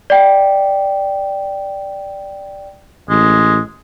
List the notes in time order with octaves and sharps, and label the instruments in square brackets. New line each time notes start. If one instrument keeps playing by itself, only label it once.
[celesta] D5 G5
[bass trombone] A1 [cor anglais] G#3